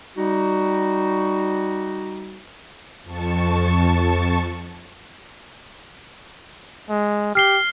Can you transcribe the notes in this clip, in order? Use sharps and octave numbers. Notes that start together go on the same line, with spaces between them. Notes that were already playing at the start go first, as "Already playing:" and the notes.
G3 D#4 F#4
F2 A5 C#6
G#3
G4 F6 C7 G7